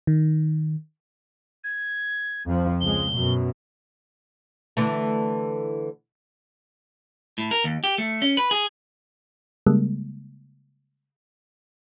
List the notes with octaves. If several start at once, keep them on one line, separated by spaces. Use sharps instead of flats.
D#3
G#6
F2 F3
C#2 G#3 G7
F#2 B2
D3 E3 A3
A2
A#4
D#2
G4
A3
C#4
B4
G#4
C#3 G3 G#3 A#3